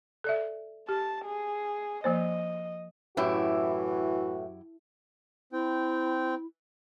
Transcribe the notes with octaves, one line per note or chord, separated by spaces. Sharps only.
A4 D5 E5
G4 A5
G#4
F3 A#3 C5 D#5
F#2 A2 E3 E4 F#4 G4
C4 E4 G5